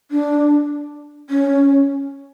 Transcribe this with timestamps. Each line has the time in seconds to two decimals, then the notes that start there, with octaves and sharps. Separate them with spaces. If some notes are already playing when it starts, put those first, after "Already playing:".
0.11 D4
1.30 C#4